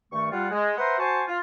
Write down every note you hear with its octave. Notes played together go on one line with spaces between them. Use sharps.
G2 D#3 A3 C#6
G3 F4 F#5
G#3
B4 C5 E5 F#5 A#5 C6
F#4 C5 G#5 A5 C6 C#6
F4